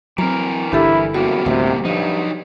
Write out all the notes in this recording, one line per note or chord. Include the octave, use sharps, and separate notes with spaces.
E3 F#3 C4 A#4 A#5
G1 D3 D4 E4 G4 A4
F#1 B2 G3 A#3 F#4
D2 A2 C3
G2 F3 F#3 D#4